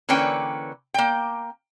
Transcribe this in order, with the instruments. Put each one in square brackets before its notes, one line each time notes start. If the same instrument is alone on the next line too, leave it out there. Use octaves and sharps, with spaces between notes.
[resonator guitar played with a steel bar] D3 E3 A#3 C#4 B4 G5
A#3 G5